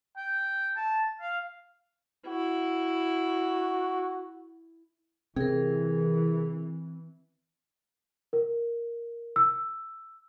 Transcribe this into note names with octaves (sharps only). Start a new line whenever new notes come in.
G5
A5
F5
E4 F#4
C3 E3 C4 G#4 A#4
A#4
E6